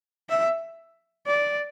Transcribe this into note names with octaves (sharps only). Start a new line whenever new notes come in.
E5
D5